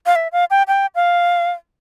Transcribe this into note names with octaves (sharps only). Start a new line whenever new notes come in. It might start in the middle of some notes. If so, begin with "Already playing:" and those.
F5
E5
F5
G5
G5
F5